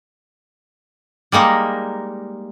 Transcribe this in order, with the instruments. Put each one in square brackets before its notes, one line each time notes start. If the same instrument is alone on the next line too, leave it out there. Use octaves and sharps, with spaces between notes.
[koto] G3 G#3 A#3 D#4